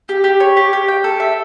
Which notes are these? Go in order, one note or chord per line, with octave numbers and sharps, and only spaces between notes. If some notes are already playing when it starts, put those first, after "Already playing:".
G4
G4
C#5
G4
G4
G5
A4
E5